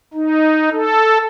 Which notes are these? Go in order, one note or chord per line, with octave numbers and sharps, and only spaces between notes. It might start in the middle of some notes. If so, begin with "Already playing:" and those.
D#4
A4